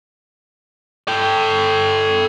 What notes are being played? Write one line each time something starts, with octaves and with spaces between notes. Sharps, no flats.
A4 G5